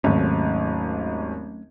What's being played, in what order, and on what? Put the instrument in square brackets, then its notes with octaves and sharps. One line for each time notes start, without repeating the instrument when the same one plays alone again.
[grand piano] G#1 D#2 [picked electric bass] F#3 A3 C#4